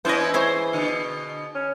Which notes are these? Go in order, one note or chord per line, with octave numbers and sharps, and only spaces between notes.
E3 B3 C#4 E4 C5 D#5
E4 G#4 C5 C#5
B2 D3
C#4